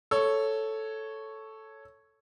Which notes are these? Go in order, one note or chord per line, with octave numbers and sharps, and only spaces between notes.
A4 C#5